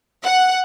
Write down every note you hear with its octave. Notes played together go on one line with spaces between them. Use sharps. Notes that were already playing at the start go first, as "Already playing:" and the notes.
F#5